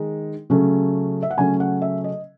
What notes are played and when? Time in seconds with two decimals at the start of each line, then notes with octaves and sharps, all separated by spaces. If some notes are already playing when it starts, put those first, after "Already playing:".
Already playing: D#3 G#3 D#4
0.50 C#3 F#3 A3 C#4
1.23 E5
1.30 F#5
1.37 C#3 F#3 A3 C#4 G#5
1.60 F#5
1.82 E5
2.04 D#5